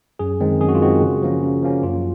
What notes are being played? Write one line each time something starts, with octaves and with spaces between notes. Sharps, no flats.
F#2 G#4
D#3 G#3 C4
F#2 G#4
F#4
F4
D#3 G#3 C4 F#4
C#3
F3 A#3 C#4
C#3
F3 A#3 C#4
F#2 F4